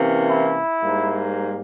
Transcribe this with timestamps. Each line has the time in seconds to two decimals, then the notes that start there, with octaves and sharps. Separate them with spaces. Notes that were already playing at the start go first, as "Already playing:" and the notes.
Already playing: C3 E3 A#3 C#4
0.28 E4
0.82 G#2 G3 A#3